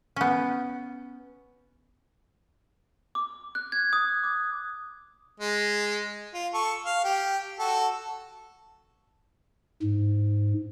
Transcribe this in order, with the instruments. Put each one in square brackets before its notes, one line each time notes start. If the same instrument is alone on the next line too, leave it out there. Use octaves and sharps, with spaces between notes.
[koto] B3 C#4
[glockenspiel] D6
F#6
G#6
D#6
D6
[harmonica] G#3
F4
A4 C#6
F5
G4
F#4 A4
[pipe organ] G#2